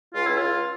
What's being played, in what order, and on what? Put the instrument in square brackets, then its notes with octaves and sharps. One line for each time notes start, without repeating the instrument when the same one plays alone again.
[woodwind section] C#2 [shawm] F4
[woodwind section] C#2 [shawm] E4
[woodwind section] C#2 [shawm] F4